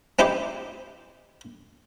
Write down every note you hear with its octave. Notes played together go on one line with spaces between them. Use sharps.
C4 D#4 E4 G4